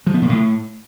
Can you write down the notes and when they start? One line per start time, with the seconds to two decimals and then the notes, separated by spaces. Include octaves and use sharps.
0.07 F3
0.14 B3
0.22 A#2
0.29 A2